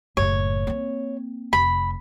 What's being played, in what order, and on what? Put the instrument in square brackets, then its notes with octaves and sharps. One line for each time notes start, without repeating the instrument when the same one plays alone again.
[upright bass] F#1 A2 [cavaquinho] C#5
[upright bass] A#3 C4
[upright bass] F1 [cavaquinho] B5